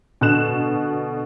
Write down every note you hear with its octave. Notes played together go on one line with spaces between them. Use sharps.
B2 D3 F#6 E7